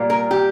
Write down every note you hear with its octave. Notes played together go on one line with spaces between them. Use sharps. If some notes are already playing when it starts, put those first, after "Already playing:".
Already playing: A#2 G3 A#3
A#4
G4